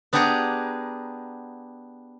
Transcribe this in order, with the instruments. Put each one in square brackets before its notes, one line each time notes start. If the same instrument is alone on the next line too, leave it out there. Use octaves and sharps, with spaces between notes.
[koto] B3 D4 G4 G#4 F#5 A#5